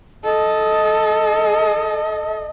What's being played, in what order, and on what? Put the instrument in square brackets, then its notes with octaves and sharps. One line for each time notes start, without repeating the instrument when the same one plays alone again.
[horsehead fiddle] A4 [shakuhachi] D#5